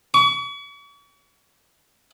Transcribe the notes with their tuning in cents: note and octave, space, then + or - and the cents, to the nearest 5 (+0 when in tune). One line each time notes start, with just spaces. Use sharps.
C#6 +40